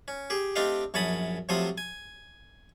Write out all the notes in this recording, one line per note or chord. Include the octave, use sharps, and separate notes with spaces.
C#4
G4 G#4
A3 C4 D4 G4 D#5 F5
A#1 F#2 C#5 A5 B5 D#6
C3 F3 F#3 A3 C5 D#6
G#5